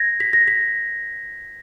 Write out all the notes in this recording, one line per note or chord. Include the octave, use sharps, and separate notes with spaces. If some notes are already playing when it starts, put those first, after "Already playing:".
Already playing: G#6 A#6
B6
A#6
B6